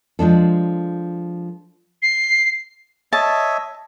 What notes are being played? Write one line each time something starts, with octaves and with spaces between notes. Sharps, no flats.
F3 G#3 D4 A4
C7
C#5 D#5 E5 A5